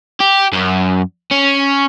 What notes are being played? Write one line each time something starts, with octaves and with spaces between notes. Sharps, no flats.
G4
F#2
C#4